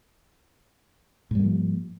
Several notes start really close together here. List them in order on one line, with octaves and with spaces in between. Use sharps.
G#2 G3 A#3 F3